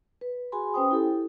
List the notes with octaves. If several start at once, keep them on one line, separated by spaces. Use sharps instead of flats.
B4
F#4 G#4 G#5 B5 C6
C#4 B4 C5 G5 D#6
E4 G4 A4